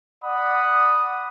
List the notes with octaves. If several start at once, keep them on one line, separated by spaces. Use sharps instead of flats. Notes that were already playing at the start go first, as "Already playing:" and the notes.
D5 F#5 B5 D#6